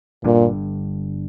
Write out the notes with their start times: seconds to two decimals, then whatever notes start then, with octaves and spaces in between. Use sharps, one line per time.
0.24 G1 G2 A#2 D3